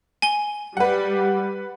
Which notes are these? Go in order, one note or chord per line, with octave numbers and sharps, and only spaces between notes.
G#5 G7
G3 B4 F#5